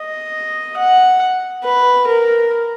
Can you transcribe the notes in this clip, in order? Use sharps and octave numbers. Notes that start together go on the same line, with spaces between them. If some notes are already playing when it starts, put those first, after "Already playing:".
Already playing: D#5
F#5
B4
A#4